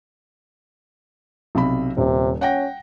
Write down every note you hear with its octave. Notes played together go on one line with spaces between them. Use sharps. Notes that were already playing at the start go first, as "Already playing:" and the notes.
B1 C3 B5
D#1 C3
C#4 F#5 G5 A#6